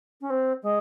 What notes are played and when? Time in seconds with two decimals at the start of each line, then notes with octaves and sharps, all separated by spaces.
0.21 C#4
0.30 C4
0.62 G#3